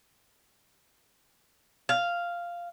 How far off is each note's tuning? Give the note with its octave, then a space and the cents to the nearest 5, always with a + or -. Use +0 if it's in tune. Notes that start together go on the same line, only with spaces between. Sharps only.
F5 -5